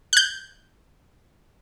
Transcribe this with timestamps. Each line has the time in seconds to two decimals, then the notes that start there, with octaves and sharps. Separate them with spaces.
0.13 F#6 G6